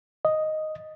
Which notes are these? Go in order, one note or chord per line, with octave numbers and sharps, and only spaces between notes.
D#5